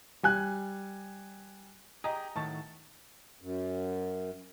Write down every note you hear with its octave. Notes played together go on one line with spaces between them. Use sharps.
G3 G#5 F#6
G4 G#4 D#5 A#5
A2 D#3 F#3 A5 C#6 A6
F#2